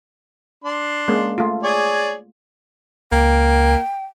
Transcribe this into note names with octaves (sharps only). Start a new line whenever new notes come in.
D4 C6
G#3 A#3 C#4
A3 F4
G#4 C#5 D5
C#2 A#3 G5